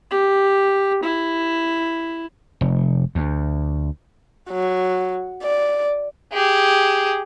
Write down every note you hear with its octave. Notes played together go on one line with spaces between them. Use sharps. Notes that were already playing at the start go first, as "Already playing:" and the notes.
G4
E4
F1
D2
F#3
D5
G4 G#4